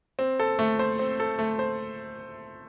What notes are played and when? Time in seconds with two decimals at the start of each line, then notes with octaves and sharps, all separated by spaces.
0.19 C4
0.40 A4
0.59 A3
0.79 C5
0.99 C4
1.20 A4
1.39 A3
1.59 C5